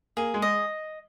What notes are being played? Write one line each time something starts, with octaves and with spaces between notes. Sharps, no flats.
A#3 G#4
G#3
D#5